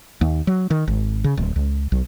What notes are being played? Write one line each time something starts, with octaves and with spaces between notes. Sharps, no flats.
D#2
F#3
D#3
G#1
C#3
D1
C#2
B1